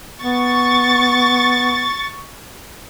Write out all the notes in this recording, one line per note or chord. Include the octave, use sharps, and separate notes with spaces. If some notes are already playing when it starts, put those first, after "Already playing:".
B3 C#6 A6